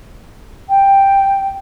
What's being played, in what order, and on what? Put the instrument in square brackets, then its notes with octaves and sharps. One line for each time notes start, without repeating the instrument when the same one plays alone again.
[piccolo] G5